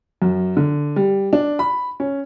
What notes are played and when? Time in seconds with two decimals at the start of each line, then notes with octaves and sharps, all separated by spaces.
0.22 F#2
0.57 D3
0.96 G3
1.33 D4
1.59 B5
2.00 C#4